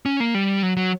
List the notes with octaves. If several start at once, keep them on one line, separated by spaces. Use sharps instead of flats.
C#4
A#3
G3
F#3
F#3